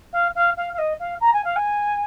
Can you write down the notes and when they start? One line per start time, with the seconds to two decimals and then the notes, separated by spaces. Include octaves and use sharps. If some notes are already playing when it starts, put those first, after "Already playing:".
0.12 F5
0.35 F5
0.56 F5
0.73 F5
0.78 D#5
0.99 F5
1.20 A#5
1.33 G#5
1.44 F5
1.56 G#5